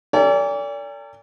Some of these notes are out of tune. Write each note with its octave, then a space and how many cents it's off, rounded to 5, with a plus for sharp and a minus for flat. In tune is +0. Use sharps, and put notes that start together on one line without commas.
A4 +45 D5 -35 G#5 -45